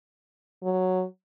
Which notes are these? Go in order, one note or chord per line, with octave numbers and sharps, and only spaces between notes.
F#3